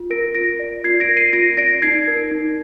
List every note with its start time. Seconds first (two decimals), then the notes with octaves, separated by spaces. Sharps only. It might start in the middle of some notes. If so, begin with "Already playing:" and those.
Already playing: F4
0.10 A#4 A#6 D7
0.35 F4 A#6 D7
0.59 D5
0.84 F4 G#6 C7
1.00 A#6 D7
1.09 A#4
1.17 C7 D#7
1.33 F4 A#6 D7
1.57 D5 A#6 D7
1.82 D#4 G#6 C7
2.08 A#4
2.31 D#4